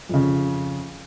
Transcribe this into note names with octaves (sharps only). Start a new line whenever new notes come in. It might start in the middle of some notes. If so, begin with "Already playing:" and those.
F2 C#3